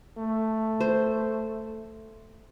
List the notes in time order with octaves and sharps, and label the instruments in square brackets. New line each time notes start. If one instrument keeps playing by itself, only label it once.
[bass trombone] A3
[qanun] C5